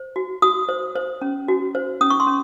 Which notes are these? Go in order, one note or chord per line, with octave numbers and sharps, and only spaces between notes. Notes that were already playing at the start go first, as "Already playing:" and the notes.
Already playing: C5
F#4
F#4 D#6
C5
C5
C#4
F#4
C5
C#4 D#6
C#6
C6
C#4